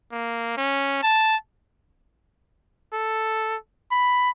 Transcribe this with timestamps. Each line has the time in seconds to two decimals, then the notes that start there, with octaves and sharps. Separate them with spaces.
0.11 A#3
0.57 C#4
1.03 A5
2.93 A4
3.91 B5